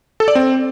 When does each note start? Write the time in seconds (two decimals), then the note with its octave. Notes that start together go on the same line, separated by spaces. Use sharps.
0.20 A4
0.28 D5
0.35 C4